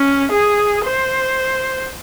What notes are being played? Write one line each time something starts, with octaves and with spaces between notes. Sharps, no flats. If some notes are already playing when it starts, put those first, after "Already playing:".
Already playing: C#4
G#4
C5